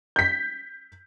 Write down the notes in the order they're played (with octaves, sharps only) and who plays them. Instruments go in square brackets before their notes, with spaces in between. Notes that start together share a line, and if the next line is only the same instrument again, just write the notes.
[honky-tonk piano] G6 B6